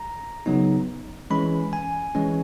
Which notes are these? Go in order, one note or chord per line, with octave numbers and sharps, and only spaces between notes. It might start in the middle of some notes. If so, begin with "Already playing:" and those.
Already playing: A#5
C#3 F#3 B3 D#4
E3 G#3 C#4 B5
G#5
E3 G#3 C#4